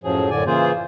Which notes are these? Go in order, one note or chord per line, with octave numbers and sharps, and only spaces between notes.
F#2 A2 F3 F#3 G#4
F#2 A2 D3 D5 G#5
C#3 E3 A#3 F4 G#4 C5